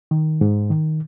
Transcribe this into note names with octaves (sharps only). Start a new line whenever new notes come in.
D#3
G#2
D#3